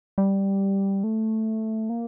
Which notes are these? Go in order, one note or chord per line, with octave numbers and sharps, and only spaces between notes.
G3
A3
A#3